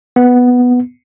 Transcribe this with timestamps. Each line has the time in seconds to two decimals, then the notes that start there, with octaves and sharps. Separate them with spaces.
0.16 B3